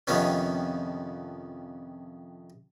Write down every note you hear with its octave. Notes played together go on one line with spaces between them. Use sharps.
F2 C3 D#3 F3 B3 C#4